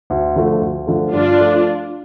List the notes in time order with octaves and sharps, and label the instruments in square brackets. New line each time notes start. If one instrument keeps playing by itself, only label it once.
[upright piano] D2
D3 F3 A3
D2
D3 F3 A3
[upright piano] G2 [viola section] D4 F4
[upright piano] F3 A3